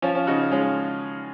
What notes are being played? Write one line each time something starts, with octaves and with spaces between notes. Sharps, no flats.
F3 C#4 F4
C#4 F4
C#3 D#4 F#4
D#4
G#3 C#4 F4